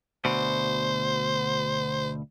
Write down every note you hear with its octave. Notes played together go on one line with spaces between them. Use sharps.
D2 B2 C5